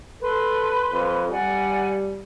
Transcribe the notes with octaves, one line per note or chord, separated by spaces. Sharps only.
A4 B4 C6
F2
G3 D5 F#5 G#5